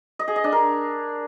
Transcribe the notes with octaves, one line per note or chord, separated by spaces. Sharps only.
D#5
G#4
D#5
D4
A#4